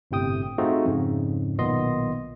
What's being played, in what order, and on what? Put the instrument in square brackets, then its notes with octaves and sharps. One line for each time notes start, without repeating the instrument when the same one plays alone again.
[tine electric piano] G1 A2 C3 G5 D#6
A3 C4 D#4 F4 F#4 G#4
F2 G#2 C#3
B1 A#2 D#3 B3 D#5 C6